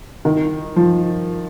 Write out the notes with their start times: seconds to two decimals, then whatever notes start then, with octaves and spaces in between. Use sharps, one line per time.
0.25 D#3
0.76 F3